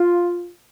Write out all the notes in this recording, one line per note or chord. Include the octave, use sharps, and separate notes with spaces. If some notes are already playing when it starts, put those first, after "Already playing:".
Already playing: F4